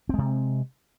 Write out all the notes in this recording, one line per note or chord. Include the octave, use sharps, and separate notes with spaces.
C3 G#3 C4